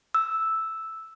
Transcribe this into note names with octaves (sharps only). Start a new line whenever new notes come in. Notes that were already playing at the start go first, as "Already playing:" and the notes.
E6